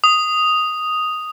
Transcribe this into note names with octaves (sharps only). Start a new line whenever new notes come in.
D#6